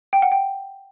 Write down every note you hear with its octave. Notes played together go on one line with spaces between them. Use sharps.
G5
F#5
G5